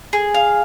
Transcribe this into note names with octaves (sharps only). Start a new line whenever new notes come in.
G#4
F5